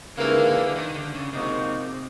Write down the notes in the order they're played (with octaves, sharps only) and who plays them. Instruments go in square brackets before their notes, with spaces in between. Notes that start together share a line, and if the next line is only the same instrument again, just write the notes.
[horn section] G#2 E3 G3 A#3 [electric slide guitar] C#3
[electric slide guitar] D3
D3
D#3
D3
C#3
[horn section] G#2 F3 A#3 D#4 F#4 [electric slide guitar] C3